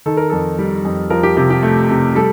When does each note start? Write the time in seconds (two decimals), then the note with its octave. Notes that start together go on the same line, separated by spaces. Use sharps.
0.06 D#3 A4
0.17 A#4
0.30 F2 A4
0.59 G3
0.85 F2
1.10 F3 A#4
1.23 G4
1.37 C3 G4
1.50 G4
1.63 A3
1.90 C3
2.15 G3 A4